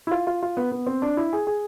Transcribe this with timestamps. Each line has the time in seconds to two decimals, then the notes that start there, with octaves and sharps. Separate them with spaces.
0.07 E4
0.11 F4
0.27 F4
0.43 F4
0.57 B3
0.71 B3
0.87 C4
1.02 D4
1.17 E4
1.33 G#4
1.47 G#4